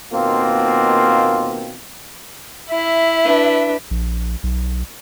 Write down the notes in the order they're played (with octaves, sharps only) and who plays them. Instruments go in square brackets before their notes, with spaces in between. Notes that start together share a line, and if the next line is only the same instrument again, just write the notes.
[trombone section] D#2 B2 A#3 C4 F4
[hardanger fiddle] E4 [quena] E5
[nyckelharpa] D4 B4
[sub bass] A#1
B1